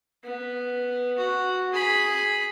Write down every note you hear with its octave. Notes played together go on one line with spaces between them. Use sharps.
B3
F#4
G#4 B5